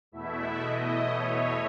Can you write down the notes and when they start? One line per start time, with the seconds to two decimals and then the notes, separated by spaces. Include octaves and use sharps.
0.12 E2 B2 A3 E4 E5
0.57 D#5
1.01 C#5